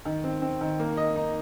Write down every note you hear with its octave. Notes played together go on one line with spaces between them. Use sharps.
D#3
C4
C4
D#3
A#3
D#5
D#4